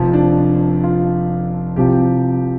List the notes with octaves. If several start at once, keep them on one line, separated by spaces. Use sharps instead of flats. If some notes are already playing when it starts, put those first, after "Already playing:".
Already playing: F1 F2 F3
D4
F4
C2 C3 F3 G4